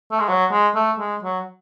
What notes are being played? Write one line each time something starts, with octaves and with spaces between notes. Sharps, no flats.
A3
G#3
F#3
G#3
A3
G#3
F#3